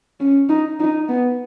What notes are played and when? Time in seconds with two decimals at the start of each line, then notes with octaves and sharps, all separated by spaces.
0.20 C#4
0.49 D#4
0.80 D#4
1.09 B3